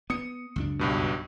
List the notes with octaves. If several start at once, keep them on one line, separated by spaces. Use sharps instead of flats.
B3 D#6 C#7
C#2 F#2 D4
B1 G2 B2